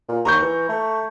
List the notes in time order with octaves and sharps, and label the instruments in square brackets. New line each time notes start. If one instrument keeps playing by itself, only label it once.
[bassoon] A#2
[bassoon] D#2 [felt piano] A#5 C#6 G6
[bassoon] E3
A3